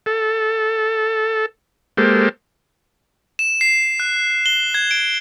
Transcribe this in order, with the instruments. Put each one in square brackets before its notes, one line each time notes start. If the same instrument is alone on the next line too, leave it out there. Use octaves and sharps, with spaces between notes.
[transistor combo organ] A4
G#3 A#3 G4 A4 C5
[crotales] E7
C7
F#6
G7
G#6
D7